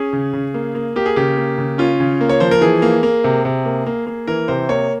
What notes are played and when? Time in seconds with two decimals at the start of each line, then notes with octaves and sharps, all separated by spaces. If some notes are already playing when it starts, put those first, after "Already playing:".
Already playing: C#4 G#4
0.13 C#3
0.33 C#3
0.54 A#3
0.75 A#3
0.96 A#3 G4
1.06 G#4
1.16 C#3 G4
1.37 A#3
1.58 C#3
1.78 C#4 F4
2.00 C#3
2.21 A#3
2.30 C#5
2.40 F3 C5
2.51 A#4
2.61 E3 G#4
2.82 A#3
3.03 A#3
3.24 C3
3.45 C3
3.65 A#3
3.87 A#3
4.07 A#3
4.27 E3 A#4
4.48 C3 C5
4.69 A#3 C#5